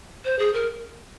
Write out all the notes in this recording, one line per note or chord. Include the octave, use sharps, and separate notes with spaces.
C5
G#4
A#4